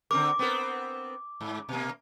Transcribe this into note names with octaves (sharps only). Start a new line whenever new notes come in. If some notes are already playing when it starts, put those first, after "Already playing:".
D3 C4 A#4 D6
B3 C4 A#4
G#2
B2 A#3